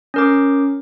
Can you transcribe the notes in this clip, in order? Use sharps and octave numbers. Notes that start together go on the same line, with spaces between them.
C#4 A#4 D6